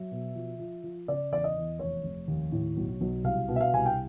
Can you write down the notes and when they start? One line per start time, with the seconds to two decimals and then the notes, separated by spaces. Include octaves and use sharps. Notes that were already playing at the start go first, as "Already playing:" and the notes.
Already playing: F#3 E5
0.11 B2
0.35 F3
0.59 F3
0.84 F3
1.08 C#3 D5
1.32 E2 D5
1.44 D#5
1.56 E2
1.79 F1 C#5
2.04 F1
2.28 D#2
2.52 A2
2.77 B1
3.01 B1
3.24 C2 F5
3.48 B2
3.56 E5
3.61 F5
3.73 C2 G#5
3.86 G5